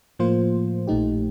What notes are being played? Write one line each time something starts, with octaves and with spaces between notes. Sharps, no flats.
A2 F3 A#3 F4 C5
A#1 A#2 A3 D#4 G4